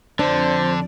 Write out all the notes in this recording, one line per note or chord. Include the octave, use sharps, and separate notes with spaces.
F2 D3 D4 C5 D5